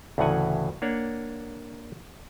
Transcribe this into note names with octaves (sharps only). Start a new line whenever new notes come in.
D2 A2 C#3 E3 F#5 G#5
A#3 D4 C#5 F#5